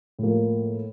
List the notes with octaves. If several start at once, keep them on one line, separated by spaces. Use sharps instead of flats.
A2 F3 A#3